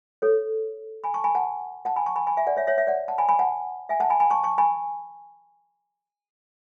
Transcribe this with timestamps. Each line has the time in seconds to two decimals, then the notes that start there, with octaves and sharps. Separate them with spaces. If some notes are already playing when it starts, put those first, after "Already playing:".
0.22 A4 C#5
1.04 G#5 B5
1.14 A5 C#6
1.24 G#5 B5
1.35 F#5 A5
1.85 F#5 A5
1.96 G#5 B5
2.06 A5 C#6
2.16 G#5 B5
2.27 G#5 B5
2.37 E5 G#5
2.47 D5 F#5
2.57 C#5 E5
2.67 C#5 E5
2.77 C#5 E5
2.87 D5 F#5
3.08 F#5 A5
3.18 G#5 B5
3.29 G#5 B5
3.39 F#5 A5
3.89 E5 G#5
4.00 F#5 A5
4.10 G#5 B5
4.20 G#5 B5
4.30 A5 C#6
4.43 A5 C#6
4.58 G#5 B5